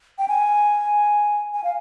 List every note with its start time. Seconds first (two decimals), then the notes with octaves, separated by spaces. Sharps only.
0.18 G5
0.28 G#5
1.54 G#5
1.64 F5